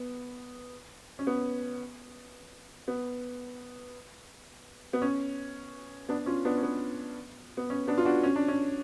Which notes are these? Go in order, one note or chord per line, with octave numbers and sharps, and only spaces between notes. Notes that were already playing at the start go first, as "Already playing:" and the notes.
Already playing: B3
C#4
B3
B3
B3
C#4
B3 D4
C#4 F4
B3 D4
C#4
B3
B3
C#4
B3 D4
F4
D4 F#4
C#4
D4
C#4